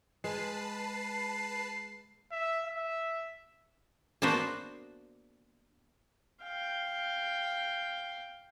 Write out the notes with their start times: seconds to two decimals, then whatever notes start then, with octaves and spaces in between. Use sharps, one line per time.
0.24 G#3 B4 A5 C7
2.31 E5
2.65 E5
4.22 A#3 B3 D4 F#4 B4 C5
6.43 F5 G5